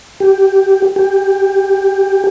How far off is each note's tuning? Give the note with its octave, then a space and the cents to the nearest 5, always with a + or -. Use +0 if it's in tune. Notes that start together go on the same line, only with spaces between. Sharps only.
G4 -5
G4 +10